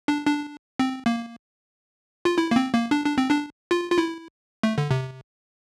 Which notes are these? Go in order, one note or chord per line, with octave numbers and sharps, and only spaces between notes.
D4
D4
C4
A#3
F4
E4
A#3
C4
A#3
D4
D4
C4
D4
F4
F4
E4
A3
D3
C3